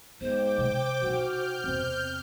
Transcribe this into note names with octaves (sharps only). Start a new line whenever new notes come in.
G#2 B3 C5 G5 D6
C3
C3 D#4 F#4 F6 G6
E2 C3 C4